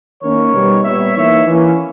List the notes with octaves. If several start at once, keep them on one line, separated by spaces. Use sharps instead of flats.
D#3 A#3 C#4 A#4 C#5
B2 G3 B3 D#4
A#2 G3 B3 C#5 E5
E3 A#3 D#4 C#5 E5
E3 A#3 C#4